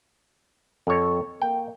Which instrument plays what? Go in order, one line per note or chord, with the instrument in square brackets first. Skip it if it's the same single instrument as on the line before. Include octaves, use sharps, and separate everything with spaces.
[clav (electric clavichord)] F2 C#5 [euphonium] A4
[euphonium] A#3 [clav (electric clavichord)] G5